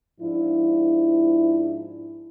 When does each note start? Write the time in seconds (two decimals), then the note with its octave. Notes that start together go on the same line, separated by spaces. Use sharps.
0.21 G#2 F3 D4 E4